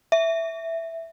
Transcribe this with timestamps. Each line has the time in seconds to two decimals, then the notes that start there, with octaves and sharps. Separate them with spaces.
0.12 E5